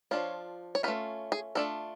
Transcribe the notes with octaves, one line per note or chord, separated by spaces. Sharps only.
F3 A3 D4 F4 C#5
C#5
A3 C#4 F4 B4
G#4
A3 D4 F4 A4